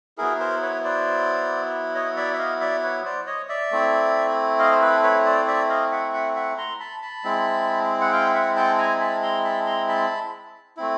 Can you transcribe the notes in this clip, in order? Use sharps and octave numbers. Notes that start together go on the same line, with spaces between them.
F#3 B3 E4 G#4 A#4
A#4 C5
B4 C#5
C5 D5
C#5 D#5
D5 E5
E5
D#5 F5
D5 E5
B4 C#5
C5 D5
C#5 D#5
D5 E5
A3 C4 E4
D#5 F5
C5
A4 B4
B4 C#5
C5 D5
D5 E5
D#5 F5
E5 F#5
E5 F#5
E5 F#5
A#5 C6
A5 B5
A5 B5
G#3 C4 E4
F#5
F5 G5
E5 F#5
G5 A5
G#5 A#5
A5 B5
A#5 C6
A5 B5
A#5 C6
A5 B5
A3 C4 E4